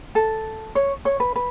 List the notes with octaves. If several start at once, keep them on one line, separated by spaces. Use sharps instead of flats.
A4
C#5
C#5
B4
B4